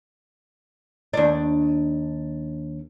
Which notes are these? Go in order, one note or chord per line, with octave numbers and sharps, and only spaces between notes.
D#2 D4